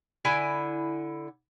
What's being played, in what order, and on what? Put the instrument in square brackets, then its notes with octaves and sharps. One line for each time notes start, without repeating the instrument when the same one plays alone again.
[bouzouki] D3 E4 G#5